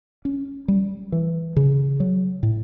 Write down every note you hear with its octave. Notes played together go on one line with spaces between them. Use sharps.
C#4
G3
E3
C#3
F#3
A2